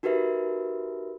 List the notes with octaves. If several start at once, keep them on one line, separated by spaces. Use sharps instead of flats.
D#4 F#4 G4 A#4 B4 E5